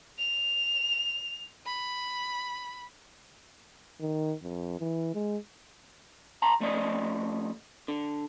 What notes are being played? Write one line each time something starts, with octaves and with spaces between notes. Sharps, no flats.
F7
B5
D#3
F2
E3
G#3
A5 A#5 C6
F3 A3 C#4 D5 D#5
D3